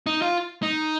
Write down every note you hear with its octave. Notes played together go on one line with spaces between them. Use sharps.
D#4
F4
D#4